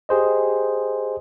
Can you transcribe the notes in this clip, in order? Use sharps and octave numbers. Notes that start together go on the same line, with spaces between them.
G4 G#4 C5 D#5